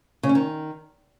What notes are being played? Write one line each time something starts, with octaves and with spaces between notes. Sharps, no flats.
C#3
C#4
D#3